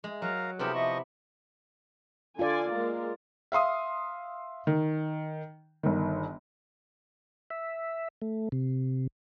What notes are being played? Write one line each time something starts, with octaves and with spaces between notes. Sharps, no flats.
G#3
F#3 A#4 F5 A#5
C3 B3 E4 G4 G#4 A#4
F3 D#5 C#6
D3 F4 A4 D5 G#5
G#3 A#3 A#4
E5 F5 C6 D#6
D#3
G1 D#3
E5
A3
C3